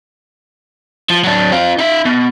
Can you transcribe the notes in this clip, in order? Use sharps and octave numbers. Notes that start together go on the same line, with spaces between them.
F3
F#3 D4
C4 F4
D#4 E5
B2